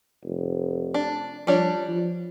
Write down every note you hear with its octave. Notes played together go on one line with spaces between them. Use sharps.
F1
D4
F3 G3 D4 C#5
F3